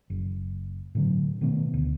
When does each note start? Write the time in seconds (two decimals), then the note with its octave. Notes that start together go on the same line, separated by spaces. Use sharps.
0.10 F#1
0.95 A2 D3 F#3
1.41 B2 D#3 A3 B3
1.74 D2